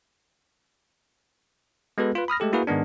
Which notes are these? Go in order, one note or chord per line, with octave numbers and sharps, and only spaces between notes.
G#3 B3 F#4 A4 B4
F4 B4
B5 D#6 F6 A#6
G#3 A3 G4 A4
A#3 E4 F#4 G#4 A#4 B4
G#2 D#3 G#3 B3 D4